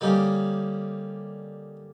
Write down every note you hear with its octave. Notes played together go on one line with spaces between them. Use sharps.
D3 G3 A#3 C#4 D#4